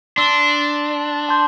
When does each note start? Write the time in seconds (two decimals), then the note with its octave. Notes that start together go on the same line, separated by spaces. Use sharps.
0.17 D4 C6 E6 B6 E7 G7
1.29 A5 C6 G6